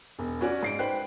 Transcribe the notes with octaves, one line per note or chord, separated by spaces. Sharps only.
E1
C#4 F#4 D5
G#2 C7 D7
B4 C5 G5 F#6